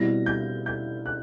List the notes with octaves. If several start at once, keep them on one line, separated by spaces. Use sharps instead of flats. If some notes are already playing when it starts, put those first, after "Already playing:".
Already playing: B2 G3 C4 E4 A#6
G6
G6
F#6